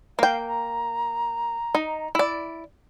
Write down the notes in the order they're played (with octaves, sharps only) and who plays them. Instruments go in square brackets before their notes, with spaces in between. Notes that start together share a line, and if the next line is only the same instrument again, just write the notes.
[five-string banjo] A#3 G5 [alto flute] F5
[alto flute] A#5
[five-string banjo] D#4
E4 D5